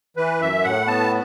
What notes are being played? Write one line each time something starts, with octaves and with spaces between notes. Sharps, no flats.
E3 B4
F#2 E5
A2 F#5
B3 A5